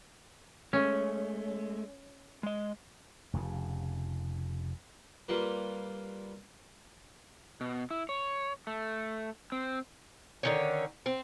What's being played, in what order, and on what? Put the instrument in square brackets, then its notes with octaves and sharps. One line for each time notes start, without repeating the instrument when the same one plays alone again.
[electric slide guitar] G#3 A3 [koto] C#4
[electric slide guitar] G#3 D#5
[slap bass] F1 F2 A#2 C#3
[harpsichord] G3 A#3 F4 B4
[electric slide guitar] B2
E4
C#5
A3
C4
[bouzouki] D3 D#3 C#4
C4